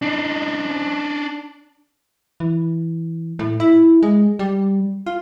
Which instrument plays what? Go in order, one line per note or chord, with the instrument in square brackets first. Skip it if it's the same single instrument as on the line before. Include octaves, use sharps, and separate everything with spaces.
[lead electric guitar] D4 D#4
[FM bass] E3
A2
E4
G#3
G3
F4